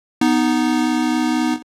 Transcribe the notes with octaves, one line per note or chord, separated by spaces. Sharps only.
B3 D#4